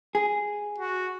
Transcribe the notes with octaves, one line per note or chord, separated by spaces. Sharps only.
G#4
F#4